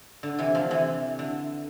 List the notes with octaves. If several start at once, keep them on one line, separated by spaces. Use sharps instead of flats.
D3
C3 E3
D3 F3
C3 E3
D3